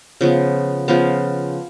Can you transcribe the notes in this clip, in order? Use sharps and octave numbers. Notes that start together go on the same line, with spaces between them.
C#3 F3 B3
C#3 F3 B3 F5